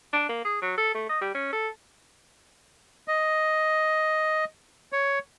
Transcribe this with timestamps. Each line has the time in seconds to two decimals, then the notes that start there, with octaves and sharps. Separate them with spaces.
0.13 D4
0.29 A#3
0.45 G#4
0.61 F#3
0.78 A4
0.94 A3
1.09 D#5
1.21 G3
1.34 C#4
1.53 A4
3.08 D#5
4.93 C#5